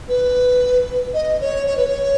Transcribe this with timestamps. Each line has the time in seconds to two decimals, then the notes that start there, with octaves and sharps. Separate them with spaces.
0.08 B4
1.13 D#5
1.40 C#5
1.66 C#5
1.77 B4
1.87 C#5